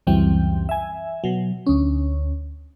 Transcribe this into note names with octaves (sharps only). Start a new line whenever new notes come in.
C#2 F#2 E3 G3 C4 G5
E5 G#5
B2 F#3
D2 C#4